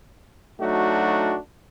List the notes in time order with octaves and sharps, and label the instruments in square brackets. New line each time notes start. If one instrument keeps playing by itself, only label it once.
[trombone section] F#3 A3 D4 D#4 F#4